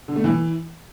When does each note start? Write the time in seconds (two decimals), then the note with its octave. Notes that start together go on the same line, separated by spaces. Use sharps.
0.08 D3
0.16 A3
0.24 E3